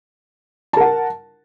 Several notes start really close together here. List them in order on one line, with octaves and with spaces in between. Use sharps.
A5 A#4 F#5